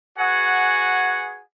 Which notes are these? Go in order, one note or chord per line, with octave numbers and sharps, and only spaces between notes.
F#4 G#4 B4 F#5 G#5